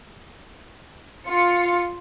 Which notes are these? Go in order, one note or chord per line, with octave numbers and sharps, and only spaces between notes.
F4 C#7